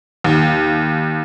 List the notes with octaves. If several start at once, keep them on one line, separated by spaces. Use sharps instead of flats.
D#2